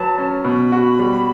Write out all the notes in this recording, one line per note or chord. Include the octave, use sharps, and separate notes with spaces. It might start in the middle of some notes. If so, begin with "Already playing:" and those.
Already playing: F#3 B4 A5
C#4
B2 B5
F#4
G3